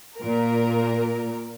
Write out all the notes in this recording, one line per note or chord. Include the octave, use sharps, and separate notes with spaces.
A#2 A#4